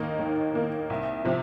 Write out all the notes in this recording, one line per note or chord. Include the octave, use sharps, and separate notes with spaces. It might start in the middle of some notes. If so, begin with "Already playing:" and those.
Already playing: D#2 D#3 A#3 D#4 A#4
D#2
D#3 A#3 D#4 A#4
C2
C3 F3